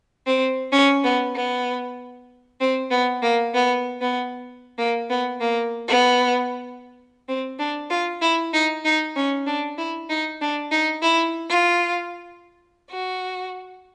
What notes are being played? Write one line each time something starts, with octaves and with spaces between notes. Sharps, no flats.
C4
C#4
B3
B3
C4
B3
A#3
B3
B3
A#3
B3
A#3
B3
C4
D4
F4
E4
D#4
D#4
C#4
D4
E4
D#4
D4
D#4
E4
F4
F#4